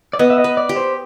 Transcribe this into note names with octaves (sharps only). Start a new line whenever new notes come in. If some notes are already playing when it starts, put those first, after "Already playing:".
D5
B3 D#5
E5
D#5
B4
D5
G4
C5